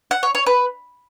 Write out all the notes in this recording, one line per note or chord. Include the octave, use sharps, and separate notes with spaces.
F#5
C#5
C#5
B4